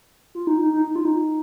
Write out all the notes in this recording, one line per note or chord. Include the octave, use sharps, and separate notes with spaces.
F4
D#4
D#4
D#4
D#4
F4
D#4